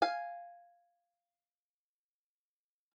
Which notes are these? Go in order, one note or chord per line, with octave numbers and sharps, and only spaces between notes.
F5 G#5